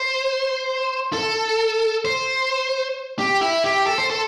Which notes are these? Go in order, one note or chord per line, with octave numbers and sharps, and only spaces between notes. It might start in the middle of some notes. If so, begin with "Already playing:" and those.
Already playing: C5
A4
C5
G4
E4
G4
A4
C5
A4